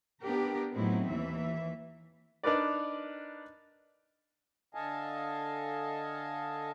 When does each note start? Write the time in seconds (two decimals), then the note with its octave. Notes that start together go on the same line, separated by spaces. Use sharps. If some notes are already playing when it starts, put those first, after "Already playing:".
0.22 B3 D4 G4 A#4
0.74 A2 F#3 B3 C4 D#4 E4
1.08 D#2 E3 E5
2.43 D4 D#4 A#4 B4 D5
4.74 D3 A4 D#5 F5 G#5 A5